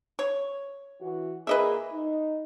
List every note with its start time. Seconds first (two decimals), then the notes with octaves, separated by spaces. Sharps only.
0.19 C#5
1.01 E3 F#4
1.47 A#2 A#3 G#4 B4 D#5 E5
1.93 D#4